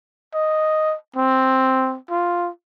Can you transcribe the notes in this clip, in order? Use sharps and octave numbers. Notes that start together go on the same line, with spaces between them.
D#5
C4
F4